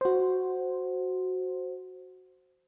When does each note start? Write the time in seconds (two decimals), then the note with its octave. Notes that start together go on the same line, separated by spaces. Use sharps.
0.01 F#4 C5